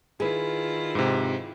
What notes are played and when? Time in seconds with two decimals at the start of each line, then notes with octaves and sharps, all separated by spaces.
0.20 D#3 E4 F4 G#4 B4
0.95 G#2 C3